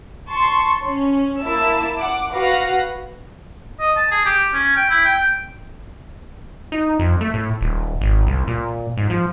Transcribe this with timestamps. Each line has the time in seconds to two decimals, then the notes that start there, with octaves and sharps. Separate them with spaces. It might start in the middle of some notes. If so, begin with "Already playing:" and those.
0.27 A5 C6 C#6
0.83 C#4
1.40 A#3 E4 A5 E6
1.98 F#5 D6
2.31 F#4 B4 F5 F#5 A#6
3.80 D#5
3.97 A5
4.11 G#4
4.25 G4
4.53 C#4
4.76 G5
4.90 E4
5.04 G5
6.72 D#4
6.99 F2
7.21 A3
7.34 A2
7.61 D#1
8.01 G#1
8.27 C2
8.47 A#2
8.97 G#2
9.10 F3